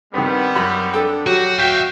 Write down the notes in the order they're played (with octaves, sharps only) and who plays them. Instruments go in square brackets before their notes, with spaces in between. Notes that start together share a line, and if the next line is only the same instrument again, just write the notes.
[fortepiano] G2 D#3 [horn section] G3 B3 [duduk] C4
[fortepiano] F#2 B5
[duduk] D4 [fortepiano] A4 G5
[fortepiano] F#3 [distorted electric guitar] F#4 [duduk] G4
[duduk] F#4 [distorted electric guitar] E5 F5 [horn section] G5